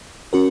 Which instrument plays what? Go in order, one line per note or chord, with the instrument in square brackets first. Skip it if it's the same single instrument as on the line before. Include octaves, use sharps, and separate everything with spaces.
[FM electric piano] C#4 F#4 A#4